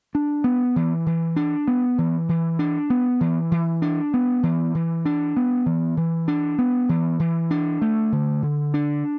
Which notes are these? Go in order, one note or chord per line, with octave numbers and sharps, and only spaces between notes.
D4
B3
E3
E3
D4
B3
E3
E3
D4
B3
E3
E3
D4
B3
E3
E3
D4
B3
E3
E3
D4
B3
E3
E3
D4
A3
D3
D3
D4